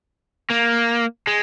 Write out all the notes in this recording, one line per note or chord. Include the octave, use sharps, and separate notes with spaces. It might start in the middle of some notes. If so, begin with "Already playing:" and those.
A#3
G#3